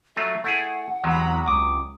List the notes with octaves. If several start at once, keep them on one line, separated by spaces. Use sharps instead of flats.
F#3 A3 F4 E5
A3 E4 G#4 F#5
E2 C3 F#3 G#3 A#5 B5
C#2 D6 D#6